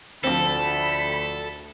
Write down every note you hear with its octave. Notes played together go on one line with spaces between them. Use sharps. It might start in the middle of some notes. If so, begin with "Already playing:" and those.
D2 F3 C4 A4 B5